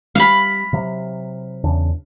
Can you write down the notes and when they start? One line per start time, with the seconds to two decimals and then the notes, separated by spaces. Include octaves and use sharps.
0.15 G3 F5 B5
0.73 C3 F#3
1.64 E2 C#3 D4